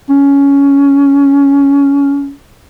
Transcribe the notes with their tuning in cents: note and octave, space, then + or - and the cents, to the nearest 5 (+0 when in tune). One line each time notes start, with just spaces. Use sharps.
C#4 +15